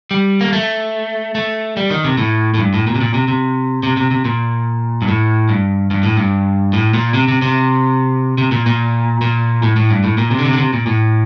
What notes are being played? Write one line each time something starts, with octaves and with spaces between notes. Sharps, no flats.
G3
A#3
A3
A3
G3
D#3
C3
A2
A2
G2
A2
A#2
C3
A#2
C3
C3
C3
C3
C3
A#2
G2
A2
G2
G2
A2
G2
A2
A#2
C3
C3
C3
C3
A#2
A#2
A#2
A2
A2
G2
A2
A#2
C3
D3
C3
D3
C3
A#2
A2